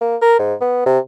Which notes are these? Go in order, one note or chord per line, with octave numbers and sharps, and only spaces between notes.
A#3
A#4
G#2
B3
C3